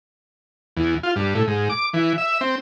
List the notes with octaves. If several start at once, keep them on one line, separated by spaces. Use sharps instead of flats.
E2
F4
G2
A2
G#2
D6
E3
E5
C4